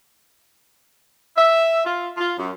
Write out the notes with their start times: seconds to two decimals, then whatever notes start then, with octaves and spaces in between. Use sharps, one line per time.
1.37 E5
1.86 F4
2.18 F4
2.38 F#2